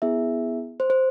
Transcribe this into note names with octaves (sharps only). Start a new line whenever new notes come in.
B3 E4 G#4 E5
C5
C5